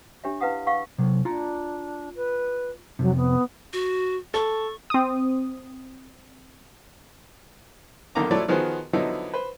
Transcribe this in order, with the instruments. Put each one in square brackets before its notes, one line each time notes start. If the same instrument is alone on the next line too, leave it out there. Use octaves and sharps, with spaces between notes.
[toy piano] D4 G4 C#5 E5
E4 B4 F5 F#5 D#6
G#4 F5 F#5 C#6 E6
[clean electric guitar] C3 F#3
[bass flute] D4 [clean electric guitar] F4 A#5
[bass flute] B4
[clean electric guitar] F2 C3 [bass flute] F#3
[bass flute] B3
[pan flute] F#4
[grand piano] A4 [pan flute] C#6
[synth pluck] C4 D#6
[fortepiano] B1 D3 D#3 A#3 A#5 D6
F3 F#3 A3 E4 C#5 D5
D#3 F3 B3 F#4 G#4 C5
D3 F3 F#3 B3 D#4 E4
B4 C5